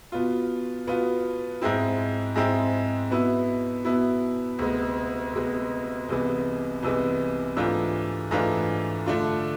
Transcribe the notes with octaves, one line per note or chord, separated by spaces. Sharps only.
B2 B3 F4
B2 B3 F4
G#2 G#3 C4 E4
G#2 G#3 C4 E4
B2 B3 E4
B2 B3 E4
D2 C3 G#3 B3
D2 C3 G#3 B3
C2 C3 E3 G#3 B3
C2 C3 E3 G#3 B3
G#2 E3 A3 D4 F4
G#2 E3 A3 D4 F4
D3 A3 D4 F4